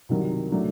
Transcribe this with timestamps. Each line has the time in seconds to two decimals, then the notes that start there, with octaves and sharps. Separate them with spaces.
0.09 C2 C3 D#3 F#3
0.52 A2 F#3 A3 D4